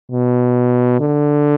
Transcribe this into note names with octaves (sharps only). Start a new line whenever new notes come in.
B2
D3